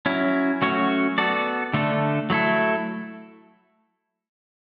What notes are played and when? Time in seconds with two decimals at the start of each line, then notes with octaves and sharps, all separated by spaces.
0.06 F#3 C#4 E4
0.62 F#3 A3 C#4 F#4 C#5
1.18 B3 F#4 A4 D5
1.74 D3 A3 D4 A4
2.30 F#3 A3 E4 A4